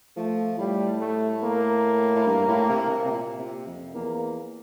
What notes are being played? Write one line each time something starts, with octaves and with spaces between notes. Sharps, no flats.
F3 A3
A2 G3
A3
A#3
A2
G2
A2
C3
C3
C3
A#2
C3
F2
E2 A#3